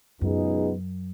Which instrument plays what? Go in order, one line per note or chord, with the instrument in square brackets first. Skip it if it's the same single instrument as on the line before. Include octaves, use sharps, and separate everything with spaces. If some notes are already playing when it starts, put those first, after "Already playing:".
[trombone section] C#2 B2 B3 D#4 G#4 [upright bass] F#2